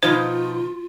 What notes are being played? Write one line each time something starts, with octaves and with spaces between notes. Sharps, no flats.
B2 F3 D#4 F4 C5